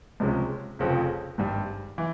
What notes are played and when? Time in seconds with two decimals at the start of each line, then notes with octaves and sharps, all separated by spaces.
0.20 C#2 C3 F3 G#3 C#4
0.79 F1 F2 C#3 F3 C4
1.38 G#1 G2 G3
1.98 E3